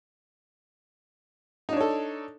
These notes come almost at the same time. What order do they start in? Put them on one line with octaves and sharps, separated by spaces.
D#4 D4 C#5 A4